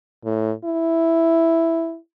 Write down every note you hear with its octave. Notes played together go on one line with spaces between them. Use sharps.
A2
E4